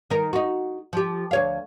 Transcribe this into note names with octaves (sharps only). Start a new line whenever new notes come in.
D#3 A#4
D#4 F#4
F3 G4
D2 C#5 F5